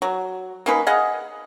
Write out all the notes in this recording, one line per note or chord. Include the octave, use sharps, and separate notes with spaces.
F#3
A#3 C#4 D#4 B4
G#4 D#5 F5 F#5